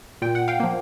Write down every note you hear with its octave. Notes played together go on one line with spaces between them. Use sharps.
A#2 G5
F#5
F5 G5
F3 A#3